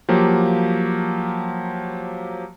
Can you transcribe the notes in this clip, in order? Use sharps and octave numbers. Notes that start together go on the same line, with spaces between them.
F3 F#3 A#3 G4